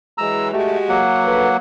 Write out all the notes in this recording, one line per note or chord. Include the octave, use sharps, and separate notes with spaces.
E3 F#3 G#3 A#5 E6
G#3 A3 F#4 G4
F#3 A#3 F#5
G2 A4 B4